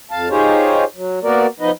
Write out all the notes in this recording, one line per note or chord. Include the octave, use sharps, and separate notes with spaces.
F2 F5 A5
D#4 F4 G4 G#4 C5 C#5
F#3
A#3 B3 F#4 A#4 D5
F3 B3 D#4 B4 D#5